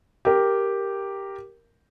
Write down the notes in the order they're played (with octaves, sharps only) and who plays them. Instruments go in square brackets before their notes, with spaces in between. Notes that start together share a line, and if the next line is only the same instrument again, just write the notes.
[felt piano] G4 A#4